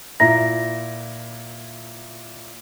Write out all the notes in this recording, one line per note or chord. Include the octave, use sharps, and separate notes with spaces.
A#2 E4 A#5 A#6